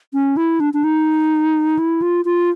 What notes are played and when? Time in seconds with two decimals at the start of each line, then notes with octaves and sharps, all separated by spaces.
0.14 C#4
0.37 E4
0.60 D4
0.74 D4
0.84 D#4
1.79 E4
2.02 F4
2.25 F4